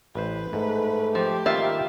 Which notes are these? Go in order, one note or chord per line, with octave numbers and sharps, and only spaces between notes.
A1 B4 C5
G#2 A3
F3 G4
D#3 G3 A#3 F4 E5